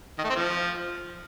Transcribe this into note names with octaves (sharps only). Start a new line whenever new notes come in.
D#3
A3
C4
F3